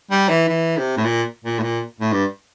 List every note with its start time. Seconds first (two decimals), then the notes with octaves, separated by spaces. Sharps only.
0.11 G3
0.29 E3
0.49 E3
0.78 C3
0.97 A2
1.05 A#2
1.44 A#2
1.59 A2
1.62 A#2
2.00 A2
2.12 G2